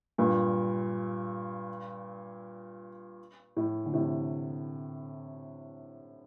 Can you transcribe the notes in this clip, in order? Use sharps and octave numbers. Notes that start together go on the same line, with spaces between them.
G2 A#2
A2
D3
A2 C3